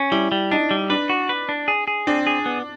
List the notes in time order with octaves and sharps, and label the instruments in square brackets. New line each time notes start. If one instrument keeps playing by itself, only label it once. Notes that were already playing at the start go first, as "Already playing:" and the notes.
Already playing: [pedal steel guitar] C#4
[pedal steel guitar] G3 [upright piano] E4
[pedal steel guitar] G3
[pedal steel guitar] D4 [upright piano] D#4
[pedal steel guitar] G3
[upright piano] D4 [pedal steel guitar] B4
[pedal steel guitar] F#4
B4
D4
G#4
G#4
[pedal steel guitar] C4 [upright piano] D4
[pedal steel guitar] G#4
B3